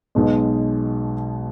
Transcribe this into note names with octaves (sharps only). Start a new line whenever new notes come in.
B1 B2 G#3